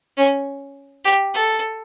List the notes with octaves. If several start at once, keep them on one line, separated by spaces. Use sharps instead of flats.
C#4
G4
A4